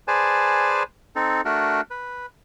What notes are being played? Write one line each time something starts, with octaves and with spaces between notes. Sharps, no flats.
G#4 B4 C5 D5 G#5 A5
C4 D#4 A4
A3 D4 F#4 A#4
B4